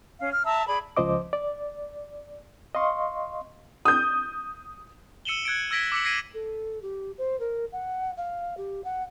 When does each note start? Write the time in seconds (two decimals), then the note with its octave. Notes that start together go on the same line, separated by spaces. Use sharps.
0.19 C#4 F5
0.32 F6
0.45 E5 A5 A#5 E6
0.67 G#4 D5 B5
0.97 C#2 F3 C5 D#5 D6
1.33 D5
2.75 D#5 F5 C6 C#6
3.85 D#6 G6
5.25 E6 C#7 D#7 E7 F#7 G7
5.45 F#6 G#6 C#7 D7
5.71 E6 G#6 A#6 B6 D7 G7
5.92 D6 E6 B6 C#7 F#7
6.04 G#6 A#6 C7 D7 D#7 F#7
6.34 A4
6.82 G4
7.18 C5
7.40 A#4
7.72 F#5
8.17 F5
8.57 G4
8.84 F#5